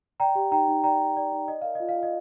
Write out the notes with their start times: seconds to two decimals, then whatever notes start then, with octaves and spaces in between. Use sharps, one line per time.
0.20 D5 G5 A#5
0.35 G4
0.52 D#4 G5 A#5
0.68 D#4
0.84 D5 G5 A#5
1.00 G4
1.16 D#4 D5
1.32 D#4
1.48 D5 D#5
1.62 A#4 F5
1.75 F4 D#5
1.89 F5
1.96 F4
2.03 D#5